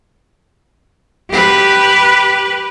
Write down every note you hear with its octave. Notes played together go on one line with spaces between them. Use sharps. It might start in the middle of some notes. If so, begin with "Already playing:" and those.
G4 B4